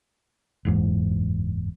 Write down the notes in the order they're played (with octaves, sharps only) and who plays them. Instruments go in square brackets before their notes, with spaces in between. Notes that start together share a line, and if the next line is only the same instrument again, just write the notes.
[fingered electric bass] F#1 E2 G#2